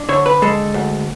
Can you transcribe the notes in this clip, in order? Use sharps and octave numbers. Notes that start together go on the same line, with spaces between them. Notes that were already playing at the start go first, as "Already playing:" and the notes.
Already playing: D4
D3 C#5
B4
G#3 A4
D2